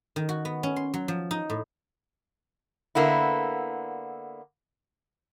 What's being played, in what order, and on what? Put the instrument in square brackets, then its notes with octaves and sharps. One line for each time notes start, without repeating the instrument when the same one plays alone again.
[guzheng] D#3
F#4
B3
C#4
C6
F#3
F3
D#4
A2
[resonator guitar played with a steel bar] D3 A#3 B3 E4